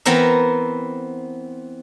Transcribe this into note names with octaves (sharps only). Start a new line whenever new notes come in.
E3 B3 C4 A#4 E5